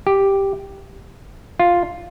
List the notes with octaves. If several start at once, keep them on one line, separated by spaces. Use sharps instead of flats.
G4
F4